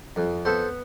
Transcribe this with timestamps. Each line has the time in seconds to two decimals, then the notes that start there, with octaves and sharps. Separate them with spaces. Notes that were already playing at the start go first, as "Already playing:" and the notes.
0.16 F2
0.45 B3 A4 C5